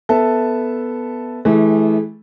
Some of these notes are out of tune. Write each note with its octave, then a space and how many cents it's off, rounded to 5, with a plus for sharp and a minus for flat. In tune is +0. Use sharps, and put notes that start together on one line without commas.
B3 +0 A4 +0 E5 +0
E3 -15 A3 -40 G#4 -35